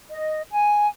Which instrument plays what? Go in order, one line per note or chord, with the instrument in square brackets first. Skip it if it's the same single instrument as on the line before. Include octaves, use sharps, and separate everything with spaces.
[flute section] D#5
G#5